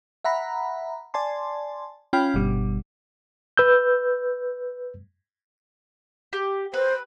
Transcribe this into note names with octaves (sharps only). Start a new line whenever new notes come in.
E5 F#5 A#5 B5
D5 G#5 A5 C6
C#4 F4 G5 B5 F6
G1 B2 G3
B4 E6 G6
G4
B4 C5